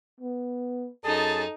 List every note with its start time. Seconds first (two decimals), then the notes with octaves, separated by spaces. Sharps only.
0.20 B3
1.05 F#2 D#4 G#4 A4 A5